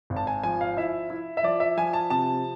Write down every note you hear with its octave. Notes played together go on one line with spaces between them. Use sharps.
G#1
A5
G#5
F3 G#5
F5
E4 E5
E4
E5
F3 D5
E5
F3 G#5
A5
C3 A5